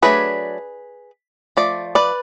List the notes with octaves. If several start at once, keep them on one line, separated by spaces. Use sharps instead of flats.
F#3 A3 D4 G#4 B4
F3 A3 D5
B4 D5